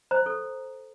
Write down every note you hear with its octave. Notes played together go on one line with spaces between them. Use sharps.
C5 A#5
A4